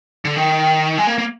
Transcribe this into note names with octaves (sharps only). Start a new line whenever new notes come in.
D3
D#3
G#3
A#3
A#3